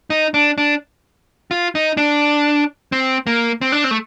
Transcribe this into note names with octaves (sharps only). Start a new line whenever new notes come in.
D#4
D4
D4
F4
D#4
D4
C4
A#3
C4
D4
C4
A3